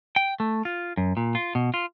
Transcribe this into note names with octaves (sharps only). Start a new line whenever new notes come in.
G5
A3
F4
F#2
A#2
F4
B2
F4